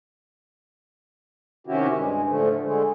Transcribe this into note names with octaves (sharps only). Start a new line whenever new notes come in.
C3 D#3 C#4 E4 F#4 G4
G2 G#3
A2 D3 F3 A3
D3 G#3 A3